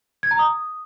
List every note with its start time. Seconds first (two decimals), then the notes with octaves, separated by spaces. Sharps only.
0.23 G#6
0.31 A#5
0.39 D#6